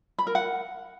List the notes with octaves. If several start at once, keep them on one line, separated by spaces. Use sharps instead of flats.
B5
A#4
F#5